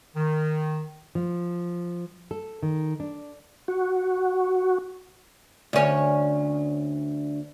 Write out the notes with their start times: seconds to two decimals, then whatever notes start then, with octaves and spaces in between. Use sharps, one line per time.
0.16 D#3
1.15 F3
2.31 A4
2.63 D#3
3.00 D4
3.68 F#4
5.73 D2 C#4